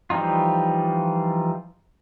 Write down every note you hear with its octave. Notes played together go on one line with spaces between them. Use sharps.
E3 F3 G3 D#4 F4